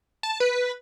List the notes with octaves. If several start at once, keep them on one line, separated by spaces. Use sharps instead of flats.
A5
B4